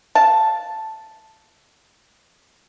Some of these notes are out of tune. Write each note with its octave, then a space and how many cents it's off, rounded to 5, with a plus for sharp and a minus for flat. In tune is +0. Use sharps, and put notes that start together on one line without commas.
F5 +0 A5 +0